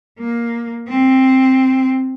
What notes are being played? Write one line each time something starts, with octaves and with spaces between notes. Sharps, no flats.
A#3
C4